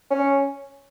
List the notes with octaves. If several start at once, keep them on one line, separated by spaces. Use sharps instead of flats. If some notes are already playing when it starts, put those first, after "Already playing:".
C#4